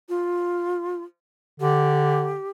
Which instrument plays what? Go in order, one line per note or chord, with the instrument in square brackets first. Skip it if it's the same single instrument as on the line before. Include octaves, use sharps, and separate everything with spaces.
[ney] F4
[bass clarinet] D3 [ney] G4